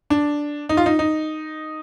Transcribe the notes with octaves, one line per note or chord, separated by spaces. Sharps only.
D4
D#4
F4
D#4
D#4